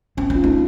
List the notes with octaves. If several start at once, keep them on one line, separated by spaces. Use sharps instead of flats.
C4 C#4
C4
F4
A#3 D#4